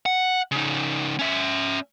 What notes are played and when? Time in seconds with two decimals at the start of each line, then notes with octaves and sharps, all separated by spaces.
0.06 F#5
0.51 C#3 D#4
1.19 C#4 E5